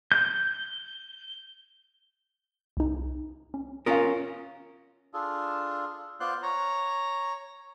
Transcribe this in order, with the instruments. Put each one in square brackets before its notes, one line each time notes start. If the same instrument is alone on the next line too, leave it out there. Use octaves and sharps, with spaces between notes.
[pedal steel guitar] G6
[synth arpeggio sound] C2 D#4
C#4
[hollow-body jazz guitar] C#4 F4 A#4 [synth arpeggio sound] F5 C6 D#6
[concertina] D4 F4 G#4 A4
B3 F4 C5 D5 C6 F#6
C#5 A#5